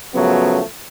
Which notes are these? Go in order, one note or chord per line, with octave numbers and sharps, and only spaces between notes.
F#2 C#3 F3 F#3 A3 B3